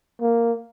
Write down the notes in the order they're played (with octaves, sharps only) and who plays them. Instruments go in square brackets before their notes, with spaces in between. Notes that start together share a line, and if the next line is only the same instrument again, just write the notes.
[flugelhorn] A#3